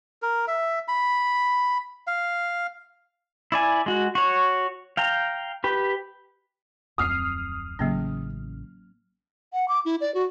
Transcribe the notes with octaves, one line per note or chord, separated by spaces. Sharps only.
A#4
E5
B5
F5
E4 D5 G#5
G#3 F#4
F#4 C#5
F5 G5 A#5
G4 B4
D1 F2 C4 D#6 F6 C7
A1 C#3 F#3 A#3 C#4
F#5
D6
E4
D5
F#4